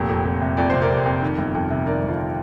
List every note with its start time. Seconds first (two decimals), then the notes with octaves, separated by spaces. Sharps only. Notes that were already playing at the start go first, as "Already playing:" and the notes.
Already playing: F1 A#2
0.09 F2
0.25 F1
0.41 C3
0.57 F2 D5
0.70 C3 C5
0.82 A#4 D5
0.90 F1
1.06 F2
1.22 D#3
1.38 G1
1.55 F2
1.70 C3
1.86 D#3 A#4 D5
2.03 G1
2.08 F4